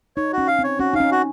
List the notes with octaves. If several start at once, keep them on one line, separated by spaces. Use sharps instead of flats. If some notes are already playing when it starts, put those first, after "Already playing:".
D#4 C#5
F#4
C#4
F5
C4
C#5
C#4 F#4
D#4 F5
C#4
F#4